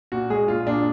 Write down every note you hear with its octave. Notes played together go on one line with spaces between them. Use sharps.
A#2 F#4
G#3 G#4
A#2 F4
A#2 D4